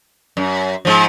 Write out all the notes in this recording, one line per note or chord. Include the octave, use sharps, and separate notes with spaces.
F#2
G#2 F3